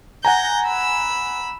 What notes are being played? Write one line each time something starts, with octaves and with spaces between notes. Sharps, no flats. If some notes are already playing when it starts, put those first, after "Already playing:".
F#5 G#5 A#5 G6 A#6
B5 E6